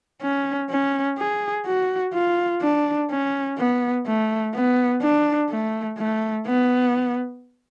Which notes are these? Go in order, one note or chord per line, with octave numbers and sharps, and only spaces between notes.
C#4
C#4
G#4
F#4
F4
D4
C#4
B3
A3
B3
D4
A3
A3
B3